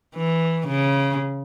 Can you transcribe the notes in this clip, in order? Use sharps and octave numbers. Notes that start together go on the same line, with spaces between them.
E3
C#3